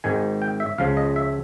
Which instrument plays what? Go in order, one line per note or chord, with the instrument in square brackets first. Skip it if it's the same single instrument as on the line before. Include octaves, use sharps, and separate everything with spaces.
[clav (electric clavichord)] G#1 G#2 D#3 G#5
G5
E5
C#2 C#3 F3 F5
D#5
E5